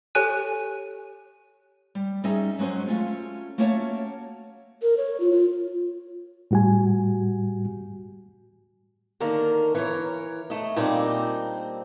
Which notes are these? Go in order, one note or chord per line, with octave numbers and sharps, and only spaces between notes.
G4 A4 C#5 G#5 F#6 D#7
G3
G3 C#4 D#4 G#4 D#5 E5
F#3 G#3 C#4 F#4 C5
A3 C#4 F4
A3 A#3 C#4 F#4 C#5 A5
A#4
C#5
F4
F4
A2 G3 F#4 G4 G#5
D3 D#3 A#3 A#4
E3 A#4 C#5
A3 D#5
A#2 G3 A#3 C4 D4 D#4